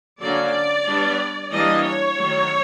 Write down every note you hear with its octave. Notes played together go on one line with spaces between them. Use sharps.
D3 F#3 A#3 C#4 D5
G3 B3 D4
E3 G3 A#3 D4 D#5
C#5
D#3 F#3 A3